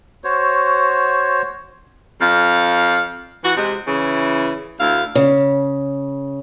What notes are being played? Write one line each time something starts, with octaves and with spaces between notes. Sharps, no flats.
F#4 C5 C#5
F2 F5
E3 F#4
C3 G#3
C#3 E3 E4
D2 E4 F5
C#3